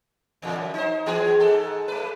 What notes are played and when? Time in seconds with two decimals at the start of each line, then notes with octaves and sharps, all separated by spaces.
0.42 E2 A#2 D3
0.56 F#2
0.74 D#4 C5
1.06 E3 B3 G#4
1.40 G#2 A4
1.88 A3 B4